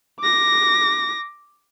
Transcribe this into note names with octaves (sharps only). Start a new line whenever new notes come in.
D6 A#6